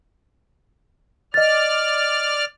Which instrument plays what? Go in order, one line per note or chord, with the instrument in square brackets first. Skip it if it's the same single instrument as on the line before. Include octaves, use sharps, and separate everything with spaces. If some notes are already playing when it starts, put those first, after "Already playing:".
[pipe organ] D5 F6 [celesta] D#5 A6